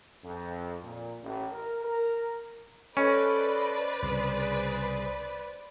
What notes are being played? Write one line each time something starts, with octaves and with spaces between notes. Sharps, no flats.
F2
A#2
A1
A#4
A#4
C#4 A4 B4 C5 D5 D#5
C2 C#3 G#4